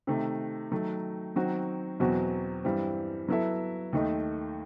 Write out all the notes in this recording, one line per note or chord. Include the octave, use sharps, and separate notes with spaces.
C3 D#3 A3
D#3 F#3 A3
D#3 F#3 C4 F#4
E2 B2 F#3 C4 F#4
G2 E3 G3 C4
F#3 B3 E4 A4 E5
D#2 D#3 A3 D#4